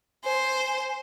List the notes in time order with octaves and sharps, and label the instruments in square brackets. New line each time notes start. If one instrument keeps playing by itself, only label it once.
[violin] C5 [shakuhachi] G#5